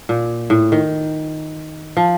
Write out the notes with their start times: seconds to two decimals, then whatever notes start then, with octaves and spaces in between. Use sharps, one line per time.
0.09 A#2
0.50 A2
0.72 D#3
1.97 F3